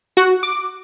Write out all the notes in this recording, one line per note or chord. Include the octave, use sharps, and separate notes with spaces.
F#4
D6